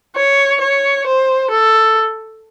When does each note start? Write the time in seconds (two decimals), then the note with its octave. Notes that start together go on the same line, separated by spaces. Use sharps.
0.16 C#5
0.60 C#5
1.06 C5
1.50 A4